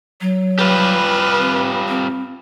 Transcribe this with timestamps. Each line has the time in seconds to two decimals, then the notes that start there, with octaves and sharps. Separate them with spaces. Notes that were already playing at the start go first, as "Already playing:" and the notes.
0.21 F#3
0.59 G3 F4 G4 B4
1.39 C4
1.88 C4